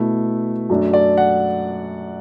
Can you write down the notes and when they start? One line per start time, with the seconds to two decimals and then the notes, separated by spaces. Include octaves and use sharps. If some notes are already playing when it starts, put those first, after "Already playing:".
Already playing: B2 A3 E4
0.69 F#2 F#3 A3 D4
0.93 D5
1.17 F#5